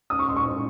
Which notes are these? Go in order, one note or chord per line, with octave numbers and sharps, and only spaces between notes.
D#6
C#6
C6
C#6